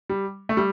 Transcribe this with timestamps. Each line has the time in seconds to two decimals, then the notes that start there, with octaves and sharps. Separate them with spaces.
0.09 G3
0.49 A3
0.57 G3